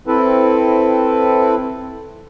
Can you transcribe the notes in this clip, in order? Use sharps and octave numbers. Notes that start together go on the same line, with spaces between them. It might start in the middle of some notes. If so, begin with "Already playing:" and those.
C4 E4 A4 B4